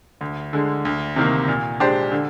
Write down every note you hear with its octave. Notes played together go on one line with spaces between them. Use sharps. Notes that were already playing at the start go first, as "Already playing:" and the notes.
D2
D3 G#3
D2
C3 D#3 A#3
A#2
G#3 D4 G4 C5
D3